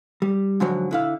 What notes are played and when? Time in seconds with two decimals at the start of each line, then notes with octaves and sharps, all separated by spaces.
0.22 G3
0.60 G#2 D3 F3 F#3
0.91 D3 E4 F5